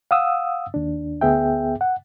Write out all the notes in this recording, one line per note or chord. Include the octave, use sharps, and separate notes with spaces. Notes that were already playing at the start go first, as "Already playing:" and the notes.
F5 F#5 D#6 E6
D#2 D4
D2 B3 G#4 E5 G5
F#5